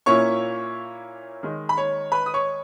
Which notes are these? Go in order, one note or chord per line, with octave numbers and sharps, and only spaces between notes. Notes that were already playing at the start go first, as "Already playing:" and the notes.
A#2 A#3 C#4 E4 C#5 C#6
D#3 G#3 D#4
B5
C#5 C#6
B4 B5
D#6
C#5 C#6